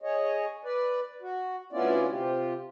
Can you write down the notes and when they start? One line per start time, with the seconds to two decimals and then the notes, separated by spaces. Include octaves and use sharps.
0.02 G#4 C#5 D#5
0.64 B4 D5
1.22 F#4
1.73 D2 B3 C#4 E4 F4 D5
2.11 C3 F4 G4